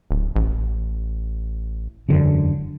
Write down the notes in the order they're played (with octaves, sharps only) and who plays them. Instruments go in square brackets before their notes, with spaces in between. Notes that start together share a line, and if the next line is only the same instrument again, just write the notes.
[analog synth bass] D1
A1
[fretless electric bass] E1 F#2 D3